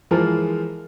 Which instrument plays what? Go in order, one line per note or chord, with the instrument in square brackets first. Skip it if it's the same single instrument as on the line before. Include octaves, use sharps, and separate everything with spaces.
[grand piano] E3 F3 G#3 F4 A#4